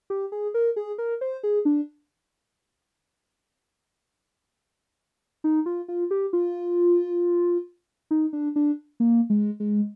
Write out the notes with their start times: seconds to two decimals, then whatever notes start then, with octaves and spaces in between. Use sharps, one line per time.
0.10 G4
0.32 G#4
0.54 A#4
0.76 G#4
0.98 A#4
1.21 C5
1.43 G#4
1.65 D4
5.44 D#4
5.66 F4
5.88 F4
6.11 G4
6.33 F4
8.11 D#4
8.33 D4
8.56 D4
9.00 A#3
9.30 G#3
9.60 G#3